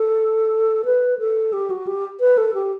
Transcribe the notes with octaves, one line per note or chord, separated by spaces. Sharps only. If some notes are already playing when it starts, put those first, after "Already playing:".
Already playing: A4
B4
A4
G4
F#4
G4
B4
A4
G4